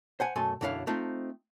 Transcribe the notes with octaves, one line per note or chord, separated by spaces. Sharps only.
C5 F#5 G#5
F#2 B2 A3 A4 G#5 C6
B1 F#2 D3 E4 C#5 F5
A3 C4 D#4 F4